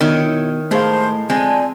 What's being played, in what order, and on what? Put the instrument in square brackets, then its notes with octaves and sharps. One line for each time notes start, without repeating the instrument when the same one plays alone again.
[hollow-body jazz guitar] B2 [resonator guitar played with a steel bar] D#3 [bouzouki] E4 C#5 D#5
[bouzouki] A2 G#3 A#4 [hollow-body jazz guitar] A3 G#4 F5 [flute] C5
[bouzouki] D3 F3 [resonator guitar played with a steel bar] G#3 [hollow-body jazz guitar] C4 [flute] G#5